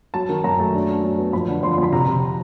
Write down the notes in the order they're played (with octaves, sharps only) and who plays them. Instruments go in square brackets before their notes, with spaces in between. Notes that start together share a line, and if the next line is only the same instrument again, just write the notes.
[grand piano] F#3 A5
D#3
F#2 A#5
A3 A5
D4
F#3
F#3
B3
F2 B5
D3
F2 C6
C6
F2 B5
C3 A#5
C3